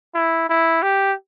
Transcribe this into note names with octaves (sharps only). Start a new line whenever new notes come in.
E4
E4
G4